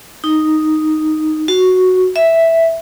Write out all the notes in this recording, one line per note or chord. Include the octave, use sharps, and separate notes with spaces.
D#4
F#4
E5